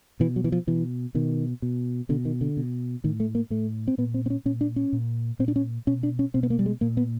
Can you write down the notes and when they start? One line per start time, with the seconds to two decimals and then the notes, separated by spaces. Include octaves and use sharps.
0.20 B2 E3
0.36 F#3
0.44 E3
0.52 F3
0.67 B2 E3
1.15 B2 D#3
1.62 B2
2.09 B2 D3
2.25 D#3
2.41 D3
2.57 B2
3.04 A2 D#3
3.20 A3
3.35 A#3
3.50 A2 A3
3.88 C4
3.98 A#2 B3
4.14 C4
4.26 C4
4.30 C#4
4.45 A#2 C#4
4.61 D4
4.76 C#4
4.93 A#2
5.39 A#2 C4
5.48 D4
5.56 C#4
5.87 B2 C#4
6.03 D4
6.19 C#4
6.34 B2 C4
6.43 B3
6.50 A#3
6.59 G3
6.66 G#3
6.81 A#2 A#3
6.97 B3